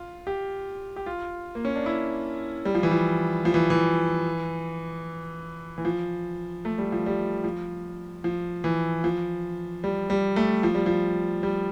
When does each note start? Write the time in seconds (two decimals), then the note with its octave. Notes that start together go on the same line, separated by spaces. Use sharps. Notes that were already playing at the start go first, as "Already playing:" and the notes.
Already playing: F4
0.27 G4
0.96 G4
1.06 F4
1.55 A#3
1.65 C#4
1.75 D4
1.86 E4
2.65 G3
2.75 F3
2.83 E3
2.91 F3
3.45 F3
3.54 E3
3.70 E3
5.78 E3
5.85 F3
6.65 A3
6.78 G3
6.92 F3
7.06 G3
7.44 F3
8.24 F3
8.64 E3
9.04 F3
9.84 G3
10.10 G3
10.36 A3
10.63 F3
10.75 G3
10.86 F3
11.43 G3